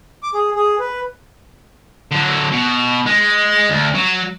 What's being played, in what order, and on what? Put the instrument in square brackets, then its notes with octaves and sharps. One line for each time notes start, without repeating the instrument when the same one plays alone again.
[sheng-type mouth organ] D6
G#4
G#4
B4
[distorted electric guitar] D3 F#3
B2
G#3
D2
F#3